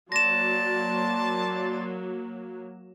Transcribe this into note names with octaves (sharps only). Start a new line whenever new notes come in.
F#3 A#3 D5 A5 C6 A#6 E7